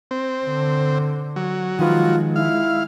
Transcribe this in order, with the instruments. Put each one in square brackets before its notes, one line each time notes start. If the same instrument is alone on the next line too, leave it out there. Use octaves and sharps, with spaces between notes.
[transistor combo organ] C4
[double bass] D3
[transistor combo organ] F#3
[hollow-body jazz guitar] D#3 F3 B4 [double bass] G#3 [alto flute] F4
[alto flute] E4 [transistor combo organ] F5